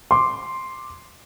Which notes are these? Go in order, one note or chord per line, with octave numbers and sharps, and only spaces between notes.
C6 D6